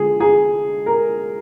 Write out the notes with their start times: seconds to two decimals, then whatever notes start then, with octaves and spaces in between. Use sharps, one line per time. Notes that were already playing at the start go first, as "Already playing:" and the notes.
Already playing: D3 F3 G#3 G#4
0.20 G#4
0.86 A#4